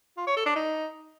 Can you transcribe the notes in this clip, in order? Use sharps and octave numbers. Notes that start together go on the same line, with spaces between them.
F4
C#5
A4
D4
D#4